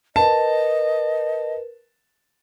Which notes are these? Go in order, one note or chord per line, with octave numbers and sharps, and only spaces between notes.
A#4 B4 D#5 A5